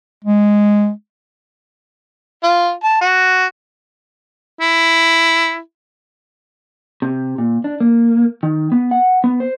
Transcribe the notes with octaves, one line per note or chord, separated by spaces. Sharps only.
G#3
F4
A5
F#4
E4
C3
A#2
D4
A#3
D#3
B3
F#5
B3
C5